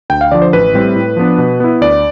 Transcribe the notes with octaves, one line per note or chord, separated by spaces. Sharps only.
D2 G5
F5
D3 F3 D5
C5
A1 B4
A2 G3 C4 E4
A2
F3 B3 D4
B2
B3 E4
D2 D5